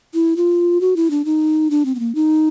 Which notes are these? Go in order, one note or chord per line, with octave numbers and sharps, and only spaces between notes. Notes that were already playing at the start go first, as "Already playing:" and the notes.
E4
F4
F#4
E4
D4
D#4
D4
C4
B3
A#3
D#4